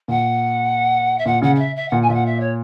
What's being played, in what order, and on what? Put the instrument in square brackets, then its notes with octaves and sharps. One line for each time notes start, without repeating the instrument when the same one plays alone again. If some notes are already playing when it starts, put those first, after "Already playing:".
[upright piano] A#2 [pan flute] F#5
[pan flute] E5
[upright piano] A#2 [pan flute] F#5
[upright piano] C#3 [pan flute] F#5
[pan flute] F#5
E5
E5
[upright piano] A#2 [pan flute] F#5
[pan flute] G#5
[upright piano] A#2 [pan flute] E5 F#5
[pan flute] E5
C#5